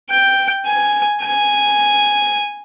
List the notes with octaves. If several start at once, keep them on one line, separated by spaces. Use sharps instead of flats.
G5
G#5
G#5